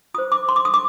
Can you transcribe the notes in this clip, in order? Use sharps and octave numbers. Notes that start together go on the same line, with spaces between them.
F4 C5 D#6
D6
C6
D6
D#6
D6